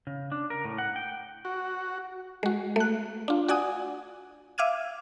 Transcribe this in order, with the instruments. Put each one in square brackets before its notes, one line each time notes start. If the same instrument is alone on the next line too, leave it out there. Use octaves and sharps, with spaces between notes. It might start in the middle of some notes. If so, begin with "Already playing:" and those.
[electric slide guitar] C#3
D4
A#4
A2
F#5
G5
[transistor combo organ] F#4
[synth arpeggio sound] G#3 F#4
A3 F#6
D4 F4
F#4 D5 F#5 G#5 D#6
E5 F5 D6 F6 G#6 D#7